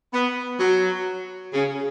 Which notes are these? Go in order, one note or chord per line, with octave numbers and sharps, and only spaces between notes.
B3
F#3
C#3